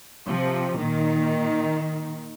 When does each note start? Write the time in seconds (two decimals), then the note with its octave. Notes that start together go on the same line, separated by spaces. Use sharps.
0.27 C3 F3
0.77 A#2 D#3